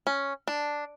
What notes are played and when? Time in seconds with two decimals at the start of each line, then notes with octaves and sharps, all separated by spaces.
0.07 C#4
0.48 D4